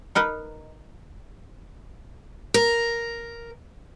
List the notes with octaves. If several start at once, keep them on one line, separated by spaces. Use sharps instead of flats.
D#4 A#4 B4 D#5
A#4